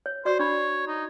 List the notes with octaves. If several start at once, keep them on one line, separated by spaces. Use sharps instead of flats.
C#5
F#4 C5 D5 C#6
D4 C#5 B5
D#4